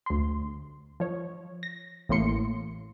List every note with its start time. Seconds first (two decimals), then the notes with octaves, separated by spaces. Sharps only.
0.06 D2 C6
1.00 F3 C#5
1.63 A#6
2.09 A1 A2 A#3 C6 C#7